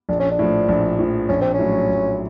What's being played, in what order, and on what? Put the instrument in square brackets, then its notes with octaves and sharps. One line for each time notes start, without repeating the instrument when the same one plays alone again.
[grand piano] A#1 [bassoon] D4
[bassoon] C#4
D4
[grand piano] A2 F3
A#1
A2 F3
[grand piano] A#1 [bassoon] C#4
[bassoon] C4
C#4
[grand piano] A2 F#3
A#1